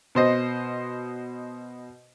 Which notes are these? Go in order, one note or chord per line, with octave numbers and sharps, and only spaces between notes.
B2 C5 D#5